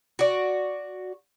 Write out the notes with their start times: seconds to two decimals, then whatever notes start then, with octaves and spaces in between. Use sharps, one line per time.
0.19 F#4 D5